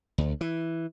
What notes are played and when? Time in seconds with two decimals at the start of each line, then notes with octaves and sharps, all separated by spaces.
0.18 D2
0.41 E3